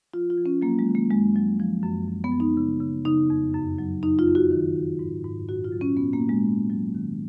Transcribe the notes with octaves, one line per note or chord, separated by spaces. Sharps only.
F3 F4
F4
F3
C#4
F#3 A#3
G#3
D#3
A#3
F#2 G#3
F#3
F3
F#2
F#2
B3
F#2
D#4
C#3
C#3
C#3 D#4
F2
F#2
F#3
F#2 D#4
F4
F#2
F#4
D#3
D#3
G#2
G#2
A#2 F#4
F4
F#3
C#4
A#2 B3
A#3
A#2
G#3
G#2
F#3
D#3